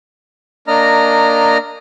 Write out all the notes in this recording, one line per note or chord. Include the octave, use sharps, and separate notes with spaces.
A#3 D4 D#5 A#5 F6